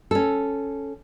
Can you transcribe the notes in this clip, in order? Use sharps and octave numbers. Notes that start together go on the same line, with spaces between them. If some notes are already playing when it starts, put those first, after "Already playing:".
C#4 A4